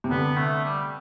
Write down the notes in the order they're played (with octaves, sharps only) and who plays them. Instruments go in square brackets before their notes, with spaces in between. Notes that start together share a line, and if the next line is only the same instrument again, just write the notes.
[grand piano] C3
[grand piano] D3 [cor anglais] B3
[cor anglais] A3
G3